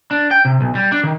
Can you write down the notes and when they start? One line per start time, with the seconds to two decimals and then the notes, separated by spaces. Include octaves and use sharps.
0.11 D4
0.31 G5
0.45 C3
0.61 B1
0.75 G3
0.92 D4
1.03 D#3